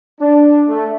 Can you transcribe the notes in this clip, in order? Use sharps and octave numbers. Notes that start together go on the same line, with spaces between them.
D4
A3